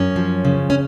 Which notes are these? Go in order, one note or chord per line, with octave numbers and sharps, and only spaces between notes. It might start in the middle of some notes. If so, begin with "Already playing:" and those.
Already playing: F#2 C#4
F3
C#3
C#4